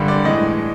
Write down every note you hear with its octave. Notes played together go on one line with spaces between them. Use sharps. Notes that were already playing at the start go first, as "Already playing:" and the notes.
Already playing: G2 D3 G3
D5
A2 E3 G#3 D#5